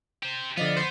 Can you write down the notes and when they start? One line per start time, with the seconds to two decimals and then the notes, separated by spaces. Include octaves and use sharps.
0.23 G4 C5
0.57 D3 F3 B3 D5 D#5 F5
0.77 C5